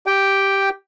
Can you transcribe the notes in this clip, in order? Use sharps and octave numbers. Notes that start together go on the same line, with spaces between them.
G4 G5